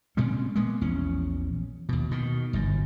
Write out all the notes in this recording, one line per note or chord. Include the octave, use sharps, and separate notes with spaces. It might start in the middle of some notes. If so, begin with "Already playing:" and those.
A#2 G#3 C4 C#4
G#3 A#3 B3
A#1 E2 C#4
D#2 B2
B2 D#3
G1 F#2